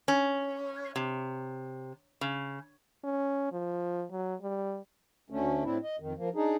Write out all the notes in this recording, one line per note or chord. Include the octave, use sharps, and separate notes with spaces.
C#4
C3
C#3
C#4
F3
F#3
G3
D2 D3 A3 C#4
A2 C4 D4 E4
D#5
F2 D#3
F3 A#3
D4 D#4 G#4